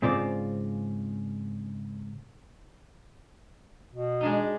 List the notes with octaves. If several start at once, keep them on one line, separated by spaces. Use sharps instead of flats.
G#2 C#3 C4 F4 D5
B2
G#3 D4 D#4